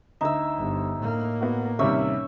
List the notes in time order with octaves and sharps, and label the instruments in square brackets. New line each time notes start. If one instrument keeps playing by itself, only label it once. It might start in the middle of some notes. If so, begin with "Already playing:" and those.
[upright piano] D2 E5 [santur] D#4 E6
[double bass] G1
A2 A#3
[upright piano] B3 F#4
[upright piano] D#2 C3 G3 [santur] C#4 E5 E6